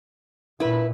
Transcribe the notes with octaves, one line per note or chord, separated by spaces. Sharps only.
A#2 E4 B4